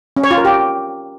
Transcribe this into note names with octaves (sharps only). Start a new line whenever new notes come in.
C#4
C#5
F4
A#4
G4